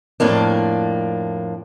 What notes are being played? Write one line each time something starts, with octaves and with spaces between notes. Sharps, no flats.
F2 A2 A#3 D4